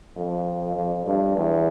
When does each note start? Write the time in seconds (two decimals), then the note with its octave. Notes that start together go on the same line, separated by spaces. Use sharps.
0.16 F2
0.76 F2
1.06 G2
1.37 E2